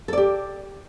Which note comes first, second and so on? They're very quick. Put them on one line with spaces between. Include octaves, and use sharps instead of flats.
A4 D5 G4